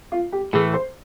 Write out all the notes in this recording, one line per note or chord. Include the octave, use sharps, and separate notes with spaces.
F4
G4
A2 E3 A3 G#4
C5